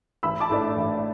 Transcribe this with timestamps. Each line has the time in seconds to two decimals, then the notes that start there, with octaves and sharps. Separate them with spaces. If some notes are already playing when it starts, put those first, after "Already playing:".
0.23 A1 B5 E6
0.40 A5 D6
0.49 A2 A3 D4
0.76 A1